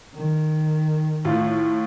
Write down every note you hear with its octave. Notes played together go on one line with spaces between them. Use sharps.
D#3
A2 F4